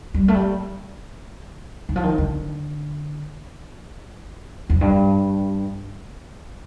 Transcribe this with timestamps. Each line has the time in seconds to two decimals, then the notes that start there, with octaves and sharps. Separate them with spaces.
0.14 G3
0.28 A3
0.34 G3
1.89 D#3
1.96 F3
2.03 D#3
2.18 D3
4.70 F2
4.81 G2